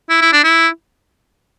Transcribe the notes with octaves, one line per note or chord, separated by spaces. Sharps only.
E4
E4
D4
E4